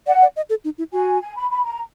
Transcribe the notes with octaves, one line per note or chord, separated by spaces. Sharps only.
D5 F#5
D5
D#5
A4
D#4
E4
F#4 G#5
G#5
B5
B5
A#5